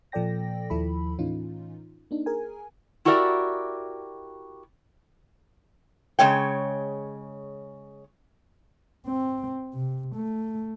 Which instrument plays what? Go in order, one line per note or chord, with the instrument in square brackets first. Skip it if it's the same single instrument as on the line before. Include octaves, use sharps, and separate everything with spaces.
[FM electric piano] A#2 F3 A4 D5 G5 A#6
D#2 F3 E4 A4 B5
A2 E3 C#4 D#4 F4
A#3 D4 D#4
G#4 A#4 G#5
[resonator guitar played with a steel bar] E4 F#4 G4 A#4 D5 E5
C#3 G#3 C#5 G5
[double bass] C4
C3
A3